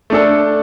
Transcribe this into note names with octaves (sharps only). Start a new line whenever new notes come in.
A3 D4 A4